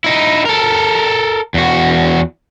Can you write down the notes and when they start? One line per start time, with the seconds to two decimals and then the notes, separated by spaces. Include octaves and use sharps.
0.04 D#4 E4
0.45 A4 A#4
1.54 E2 F#4